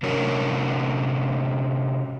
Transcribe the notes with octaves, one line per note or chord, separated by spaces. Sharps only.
C3 C#4 D4 F#4 A#4 C#5